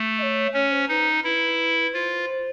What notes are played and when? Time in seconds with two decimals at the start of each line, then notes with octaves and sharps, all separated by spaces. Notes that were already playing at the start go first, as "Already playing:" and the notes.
Already playing: A3
0.18 D#5
0.22 C#5
0.54 C#4 C#5
0.72 C5
0.88 D#4 B4
1.24 E4 B4
1.94 F4 C5